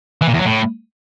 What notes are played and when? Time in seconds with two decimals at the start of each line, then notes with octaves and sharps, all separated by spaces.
0.21 E3
0.27 A#2
0.33 E2
0.39 F#3
0.45 A2